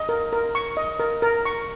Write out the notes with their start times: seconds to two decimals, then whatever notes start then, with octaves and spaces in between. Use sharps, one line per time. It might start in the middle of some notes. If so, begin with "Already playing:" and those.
Already playing: D#5
0.09 A#4
0.33 A#4
0.55 C#6
0.77 D#5
1.00 A#4
1.22 A#4
1.45 C#6